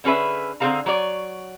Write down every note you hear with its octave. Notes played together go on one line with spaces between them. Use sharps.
D3 C#4 G#4 B4 E5
D3 C4 G#4 A4 F5 A#5
F#3 C#5 D5